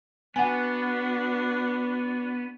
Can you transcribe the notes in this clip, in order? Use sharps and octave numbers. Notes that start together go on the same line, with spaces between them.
B3 D4 F#4 F#5 G#5